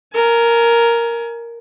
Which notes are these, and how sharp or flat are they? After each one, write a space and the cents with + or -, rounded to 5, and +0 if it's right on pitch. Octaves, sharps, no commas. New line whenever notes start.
A#4 +0 G#5 +30